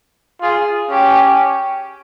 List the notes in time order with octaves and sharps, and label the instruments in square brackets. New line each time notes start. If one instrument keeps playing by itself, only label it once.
[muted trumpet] F4 [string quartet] G#4
[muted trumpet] C#4 [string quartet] G4